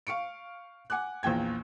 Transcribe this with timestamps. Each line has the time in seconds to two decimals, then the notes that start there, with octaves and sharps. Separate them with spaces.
0.07 F5 C#6 C#7 D7
0.90 F#5 G#5 D6 F#6
1.23 A#1 E2 A#2 G5 G#6